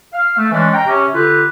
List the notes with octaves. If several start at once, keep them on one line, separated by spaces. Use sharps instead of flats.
F5
A3
E3 G#3 C#4 D4
G5 A#5
C3 C#4
D3 F4 G4 B4